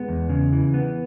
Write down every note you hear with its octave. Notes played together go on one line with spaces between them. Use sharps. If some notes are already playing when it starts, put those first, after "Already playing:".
Already playing: G#3 B3
E2
C#3
E3
B3